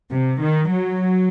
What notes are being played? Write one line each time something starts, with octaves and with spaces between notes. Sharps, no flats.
C3
D#3
F#3